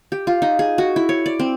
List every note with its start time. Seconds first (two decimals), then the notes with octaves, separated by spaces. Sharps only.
0.12 G4
0.27 F4
0.42 D#4
0.59 G#4
0.78 F#4
0.96 E4
1.09 C#5
1.26 D5
1.39 C4